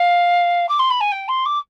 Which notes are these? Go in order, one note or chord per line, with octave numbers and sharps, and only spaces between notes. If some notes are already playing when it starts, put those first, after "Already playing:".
Already playing: F5
D6
C6
B5
G#5
G5
C6
D6